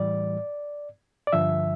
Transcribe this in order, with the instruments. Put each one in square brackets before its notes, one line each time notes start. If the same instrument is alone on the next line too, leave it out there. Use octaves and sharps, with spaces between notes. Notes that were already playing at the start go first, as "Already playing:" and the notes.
Already playing: [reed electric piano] A2 E3 G3 D5
D5
G2 D3 F3 E5